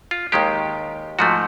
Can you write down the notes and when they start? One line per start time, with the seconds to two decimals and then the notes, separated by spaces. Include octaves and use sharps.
0.11 F4
0.32 D#2 D#3 G#3 G4
1.19 G#2 F3 A3 F#4